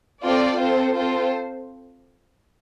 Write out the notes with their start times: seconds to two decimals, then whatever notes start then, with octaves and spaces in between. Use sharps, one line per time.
0.22 C4 F4 A4 D5
0.58 C4 F4 A4 C5
0.94 C4 F4 A4 C5